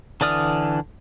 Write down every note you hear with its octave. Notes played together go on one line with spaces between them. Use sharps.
D3 E3 D5 D#6 F6